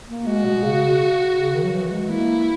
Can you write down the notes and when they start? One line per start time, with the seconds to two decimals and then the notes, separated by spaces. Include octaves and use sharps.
0.08 A#3
0.26 G#3 F#4
0.45 B2
0.63 C#3
1.37 C#3
1.54 D#3
1.63 F#3
1.73 E3
1.91 G#3
2.09 A#3 E4